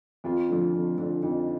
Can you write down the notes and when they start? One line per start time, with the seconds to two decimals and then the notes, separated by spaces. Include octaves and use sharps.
0.24 F2 F4
0.49 D3 F3
0.74 F2
0.98 D3 F3
1.23 F2 D#4